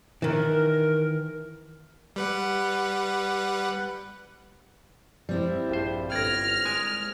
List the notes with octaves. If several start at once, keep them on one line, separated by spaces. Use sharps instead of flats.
D#3 E3 A#4
G3 B4 F#5
G3 C4 E4
A#1 G2 C5
G1 D5 F6 G#6 A#6
G#3 A#4 G#5